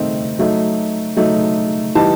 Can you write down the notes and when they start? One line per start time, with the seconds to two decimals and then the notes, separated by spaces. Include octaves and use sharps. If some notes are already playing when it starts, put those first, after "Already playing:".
Already playing: D#3 A3 C4 D#4
0.39 F#3 A3 D#4
1.16 F#3 A3 D#4
1.95 E3 G3 D#4 A5